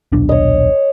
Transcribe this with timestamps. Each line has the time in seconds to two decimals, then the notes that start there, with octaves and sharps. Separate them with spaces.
0.12 D#1 B1 D4
0.29 C#5 D#5